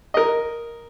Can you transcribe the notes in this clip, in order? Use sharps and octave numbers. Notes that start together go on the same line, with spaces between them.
A#4 D#5